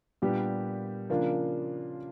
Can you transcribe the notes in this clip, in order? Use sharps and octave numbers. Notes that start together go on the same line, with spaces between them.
A#2 G3 B3 D4 G4
C#3 F3 A#3 D4 F4